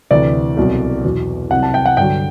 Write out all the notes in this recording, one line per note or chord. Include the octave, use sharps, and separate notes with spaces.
D2 C3 E3 D5
C2 B2 F#3
E2 B2 F#3
C2 C3 F#3 F#5
A5
G5
F#5
G2 D3 F#3 G5